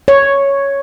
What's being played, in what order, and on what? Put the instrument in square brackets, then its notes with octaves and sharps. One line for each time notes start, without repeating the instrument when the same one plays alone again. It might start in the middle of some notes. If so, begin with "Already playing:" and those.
[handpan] C#5